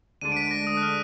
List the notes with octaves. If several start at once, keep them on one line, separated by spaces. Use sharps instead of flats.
D2 D3 G#3 D4 D#7
D7
B6
A#6
D#6
F#6
F6